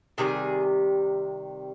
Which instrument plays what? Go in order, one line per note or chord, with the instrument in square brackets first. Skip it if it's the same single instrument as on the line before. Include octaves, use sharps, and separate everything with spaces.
[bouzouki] C3 D#3 G3 G#4